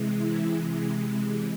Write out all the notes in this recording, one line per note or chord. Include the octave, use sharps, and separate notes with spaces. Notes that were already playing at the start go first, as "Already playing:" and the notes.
Already playing: C3 E3 G#3
E4